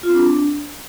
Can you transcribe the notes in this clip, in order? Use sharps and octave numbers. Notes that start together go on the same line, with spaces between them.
F4
C4
D4